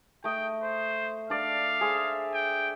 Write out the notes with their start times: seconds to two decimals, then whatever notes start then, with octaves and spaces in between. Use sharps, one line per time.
0.24 A3 D#5 G5
0.63 C5
1.30 D4 D5 F5
1.81 G#4 C5 E5
2.34 G5